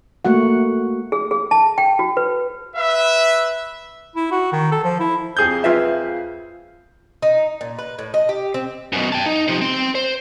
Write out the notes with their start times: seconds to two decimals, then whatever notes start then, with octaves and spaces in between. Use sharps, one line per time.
0.25 A3 A#3 F#4 F#5
1.12 G#4
1.31 G#4
1.51 A5
1.78 G5
1.99 F#4
2.17 B4
2.76 B4 E5
4.16 E4
4.32 F#4
4.52 D#3
4.72 A4
4.84 F3
5.00 E4
5.37 F2 G#4 G6
5.64 F4 B4 E5
7.22 D#4
7.61 A#2
7.79 B4
7.99 A2
8.14 D#5
8.29 G4
8.54 C4
8.92 F#2 B2
9.12 G5 A5
9.26 D#4
9.48 C3 F3
9.61 C4 C6
9.95 C5